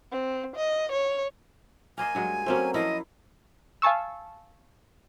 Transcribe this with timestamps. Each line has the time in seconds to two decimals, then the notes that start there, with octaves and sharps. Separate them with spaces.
0.12 C4
0.56 D#5
0.92 C#5
1.98 A#3 C5 D#5 G#5
2.15 G2 F#3 G#3
2.46 F#3 A3 A#3 C4 C#4 C5
2.74 F3 A#3 E4 D#5 B5
3.82 F5 G#5 A5 C#6 E6